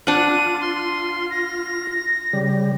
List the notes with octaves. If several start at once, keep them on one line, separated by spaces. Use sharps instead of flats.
D4 F4 F#5 D#7
C6
A#6
C#3 G3